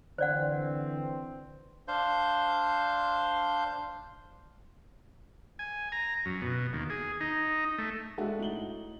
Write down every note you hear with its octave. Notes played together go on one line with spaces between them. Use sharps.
D3 E3 C4 C5 D5 F#5
D4 C5 F5 G6
G#5
A#5
F#2
B2
D#2
G#4
D#4
A3
G#3 D4 F#4 A4 E5
A2 D#4 F#7 G7